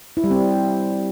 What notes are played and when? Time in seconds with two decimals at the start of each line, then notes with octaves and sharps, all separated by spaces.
0.17 E4
0.24 G3
0.31 C4